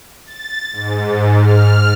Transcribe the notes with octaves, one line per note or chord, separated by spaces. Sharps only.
A6
G#2
F6